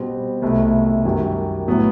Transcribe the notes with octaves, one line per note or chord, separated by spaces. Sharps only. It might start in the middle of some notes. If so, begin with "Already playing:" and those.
Already playing: B2 G3 C4
C2 B2 A3
F#2 D#3 G3
A2 F#3 B3 E4